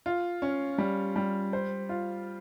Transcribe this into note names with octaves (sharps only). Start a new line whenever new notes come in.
F4
C#4
G3
G3
C5
F4